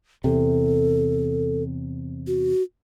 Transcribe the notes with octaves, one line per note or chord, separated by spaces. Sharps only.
E2 C3 A4
F#4